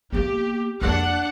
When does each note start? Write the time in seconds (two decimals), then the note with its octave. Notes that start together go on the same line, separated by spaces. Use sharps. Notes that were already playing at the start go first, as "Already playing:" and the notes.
0.12 A#3 B3 G4
0.81 F2 A#3 D4 F#5